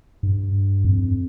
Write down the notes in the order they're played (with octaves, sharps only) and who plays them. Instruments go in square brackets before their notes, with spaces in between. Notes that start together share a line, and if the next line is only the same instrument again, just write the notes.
[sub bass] G2
F2